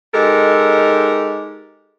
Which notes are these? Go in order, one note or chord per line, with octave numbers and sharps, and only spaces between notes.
G#3 D#4 G4 A4 A#4